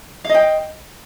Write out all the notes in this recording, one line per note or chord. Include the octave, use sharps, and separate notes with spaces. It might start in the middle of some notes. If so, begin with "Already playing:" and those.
D#5 F5 G5